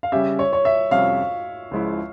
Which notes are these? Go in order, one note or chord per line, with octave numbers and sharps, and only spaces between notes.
F5
C#3 G3 C#4 G4 E5
C#5
C#5
E5
F2 C3 G3 C#4 F5
C#2 C#3 F3 G#3 E4